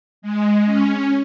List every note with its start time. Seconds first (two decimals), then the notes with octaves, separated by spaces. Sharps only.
0.22 G#3
0.65 C#4